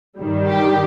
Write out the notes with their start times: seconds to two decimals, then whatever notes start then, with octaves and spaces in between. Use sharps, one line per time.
0.19 G2 D#3 G3
0.48 G4